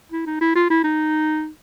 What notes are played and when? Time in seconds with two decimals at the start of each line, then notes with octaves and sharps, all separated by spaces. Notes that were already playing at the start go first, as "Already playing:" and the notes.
0.12 E4
0.26 D#4
0.41 E4
0.55 F4
0.70 E4
0.84 D#4